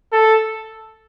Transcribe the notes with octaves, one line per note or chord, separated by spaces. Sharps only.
A4